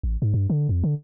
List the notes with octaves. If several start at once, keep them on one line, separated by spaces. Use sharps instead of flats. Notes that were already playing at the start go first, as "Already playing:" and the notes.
A1
G#2
G2
D3
F2
D3